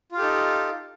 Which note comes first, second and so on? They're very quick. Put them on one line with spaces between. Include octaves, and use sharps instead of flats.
F4 F5 G4 A4 D#4